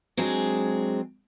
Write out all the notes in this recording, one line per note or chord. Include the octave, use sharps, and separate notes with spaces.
F#3 G#3 C4 D4 G#4